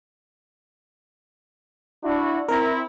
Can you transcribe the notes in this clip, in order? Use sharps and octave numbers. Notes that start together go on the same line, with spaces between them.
D4 E4 F#4
C4 E4 A#4 A#5